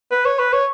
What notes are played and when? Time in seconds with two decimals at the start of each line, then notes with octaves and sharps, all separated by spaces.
0.11 B4
0.25 C#5
0.39 B4
0.53 C#5